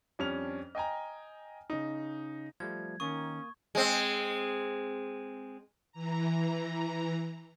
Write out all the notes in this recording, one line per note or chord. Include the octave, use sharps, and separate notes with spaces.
F2 G3 C#4 D4 F6 F7
D#5 G5 G#5 A#5
C#3 D#4
F3 G3 A3 G#6
D#3 A#3 C#4 C#6 D#6
G#3 C4
E3 A#5